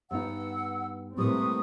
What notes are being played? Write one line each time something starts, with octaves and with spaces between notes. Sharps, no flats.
G2 B3 D#4 F#5 E6
A2 G3 A#3 C4 B4 C#6 D#6